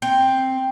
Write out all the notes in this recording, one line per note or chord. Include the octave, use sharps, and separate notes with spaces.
C4